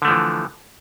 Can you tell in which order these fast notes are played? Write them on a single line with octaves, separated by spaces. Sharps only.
D3 A3 F3 E3